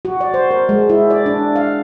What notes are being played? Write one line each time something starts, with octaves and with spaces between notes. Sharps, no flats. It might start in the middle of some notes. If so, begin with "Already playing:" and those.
F#4
D5
C5
A#4
G#3
E4
D5
D4
F5